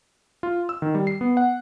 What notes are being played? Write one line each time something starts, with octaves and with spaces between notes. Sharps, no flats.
F4
E6
D#3
G3
C7
B3
F#5